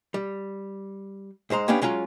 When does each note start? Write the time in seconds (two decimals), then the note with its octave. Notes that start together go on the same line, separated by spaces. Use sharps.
0.14 G3
1.50 G#2 G#3 C5 A#5
1.68 A#3 B3 C#4 D4 G4
1.82 F#3 G#3 C#4 F4 A#5